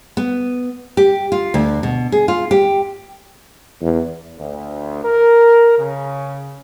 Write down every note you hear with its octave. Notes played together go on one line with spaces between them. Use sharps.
B3
G4
F4
D2
B2
G#4
F4
G4
E2
D2
A#4
C#3